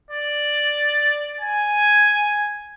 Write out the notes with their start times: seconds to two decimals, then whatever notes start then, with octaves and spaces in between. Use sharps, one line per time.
0.11 D5
1.41 G#5